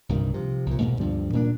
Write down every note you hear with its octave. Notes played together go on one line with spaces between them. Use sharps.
C2 G2 A#2 D#3
C3 F3
C2 A#2
G#2 B2 A#3
D2 G2 F3 G3
A#2 A#3 C4 D4